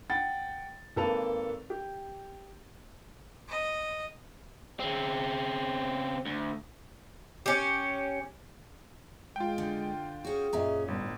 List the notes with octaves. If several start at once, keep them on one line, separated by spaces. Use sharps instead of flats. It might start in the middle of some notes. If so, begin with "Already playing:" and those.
F#5 G5 A6
G#1 A#3 A4 B4 A5 F7
G4
D#5
C#3 C4
D2
C#4 G4
G#3 F4 G5
D3
C#4 F#4 G#4
F#2 A#2 C#4 D#5 E5 A#5
G1 A2 G3